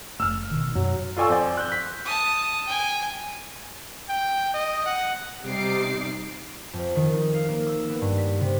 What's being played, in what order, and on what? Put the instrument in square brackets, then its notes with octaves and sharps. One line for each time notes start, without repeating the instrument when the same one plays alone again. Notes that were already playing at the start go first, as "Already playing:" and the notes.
[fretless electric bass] F1 A3 [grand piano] E6 F6
[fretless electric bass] B2 D#3
[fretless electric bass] F#2 B2 [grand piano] F#3
[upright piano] F4 A4 D5 G#5 C#6 E6
F2 C5 D5 G#5
F#6 G6
B6
[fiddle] A5 D#6
G5 G#5
[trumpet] G5
D#5
F#5
[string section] C3 G3 D#4 D6 C7
[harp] F2
D#3
D#4
F5
A#3
E6
B3
G2
B6
C3